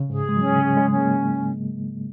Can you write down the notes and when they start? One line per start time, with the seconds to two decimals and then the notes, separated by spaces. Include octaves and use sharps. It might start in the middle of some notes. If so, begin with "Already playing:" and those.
Already playing: C#3
0.10 G#2 G#4
0.29 G#3
0.37 F#3 C#4
0.57 C#3
0.64 G#4
0.77 G#3
0.90 C#4
0.97 A#3